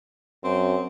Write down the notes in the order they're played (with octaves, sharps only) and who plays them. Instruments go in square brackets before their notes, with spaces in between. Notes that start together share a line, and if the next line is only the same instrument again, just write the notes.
[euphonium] F#2 [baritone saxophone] C4